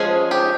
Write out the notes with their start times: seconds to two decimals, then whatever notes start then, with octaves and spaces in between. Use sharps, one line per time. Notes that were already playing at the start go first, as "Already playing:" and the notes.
Already playing: F3 G#3 C#4 G#4
0.31 G4